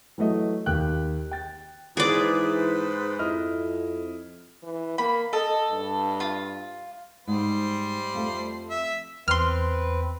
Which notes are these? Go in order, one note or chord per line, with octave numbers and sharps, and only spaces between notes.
E3 F#3 A3 D#5
D#2 G4 G5 F#6
G5 A6
G#2 E3 G#4 B4 C5 D5
F2 E4 D#5 F6
E3
A#3 B5
A4 D#5
G2
F4
G#2 G3 C5
F2 A3
E5
E2 C4 B4 C6 F6